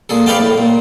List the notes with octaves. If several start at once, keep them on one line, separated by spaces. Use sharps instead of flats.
A#2 G#4 A4
A4 B4 D5 F5 G5 A5
A2
A#2